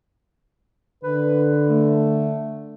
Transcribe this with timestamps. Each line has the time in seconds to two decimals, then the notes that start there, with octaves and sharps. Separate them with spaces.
1.03 D3 B4
1.68 A3